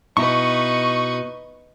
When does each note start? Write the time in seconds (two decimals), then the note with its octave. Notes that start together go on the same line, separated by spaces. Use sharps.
0.17 B2 D#4 E4 B4 C#6